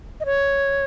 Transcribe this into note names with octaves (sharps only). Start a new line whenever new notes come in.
D#5
C#5